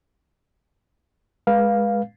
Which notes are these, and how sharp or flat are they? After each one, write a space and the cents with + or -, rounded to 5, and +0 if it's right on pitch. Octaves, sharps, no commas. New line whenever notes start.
G#3 +0 B4 -30 F5 +0